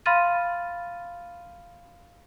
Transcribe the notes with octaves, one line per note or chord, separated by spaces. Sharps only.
F5 B5 C6 F6 A6 D#7